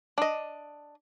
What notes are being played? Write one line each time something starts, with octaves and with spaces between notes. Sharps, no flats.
D4 D#5